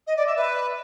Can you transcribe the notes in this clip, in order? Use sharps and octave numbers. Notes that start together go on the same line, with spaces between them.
D#5
D5
E5
B4